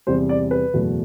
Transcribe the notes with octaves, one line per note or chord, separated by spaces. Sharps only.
E2 C3 G3 C5
D5
B4
F#1 E2 B2 A3